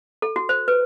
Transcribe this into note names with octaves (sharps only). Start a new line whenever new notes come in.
A4
F#4
C5
B4